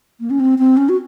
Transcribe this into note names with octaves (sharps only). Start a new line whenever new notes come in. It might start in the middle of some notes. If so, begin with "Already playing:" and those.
A#3
C#4
C4
C4
C#4
F#4